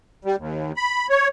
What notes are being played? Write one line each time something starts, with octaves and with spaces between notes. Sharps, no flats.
G3
D#2
B5
C#5